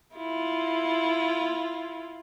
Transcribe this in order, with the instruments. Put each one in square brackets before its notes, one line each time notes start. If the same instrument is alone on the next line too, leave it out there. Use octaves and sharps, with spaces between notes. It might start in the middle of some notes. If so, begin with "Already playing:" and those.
[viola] E4 F4